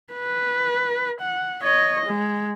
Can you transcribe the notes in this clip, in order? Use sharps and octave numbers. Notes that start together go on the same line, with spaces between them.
B4
F#5
C#5 D#5
G#3